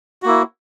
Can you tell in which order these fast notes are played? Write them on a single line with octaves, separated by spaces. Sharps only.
F#4 A#3 E4